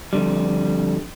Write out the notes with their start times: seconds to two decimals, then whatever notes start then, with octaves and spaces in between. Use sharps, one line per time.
0.13 F2 G#2 D3 G3